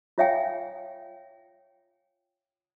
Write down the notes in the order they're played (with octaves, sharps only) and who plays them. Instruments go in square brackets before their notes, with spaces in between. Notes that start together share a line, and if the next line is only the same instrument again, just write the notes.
[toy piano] F4 C#5 E5 F5 G5 G#5